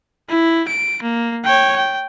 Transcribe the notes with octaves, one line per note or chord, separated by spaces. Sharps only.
E4
D7
A#3
C#5 G5
G5